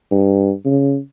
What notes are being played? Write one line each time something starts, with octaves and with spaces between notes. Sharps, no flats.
G2
C#3